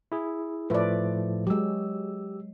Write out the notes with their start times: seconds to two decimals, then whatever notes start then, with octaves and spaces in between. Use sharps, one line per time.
0.12 E4 G#4
0.70 A2 F3 A3 B4 D5
1.47 F#3 G#3 G4 E6